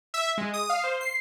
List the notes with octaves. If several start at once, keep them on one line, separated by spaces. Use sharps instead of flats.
E5
G#3
D#6
F5
C5
C7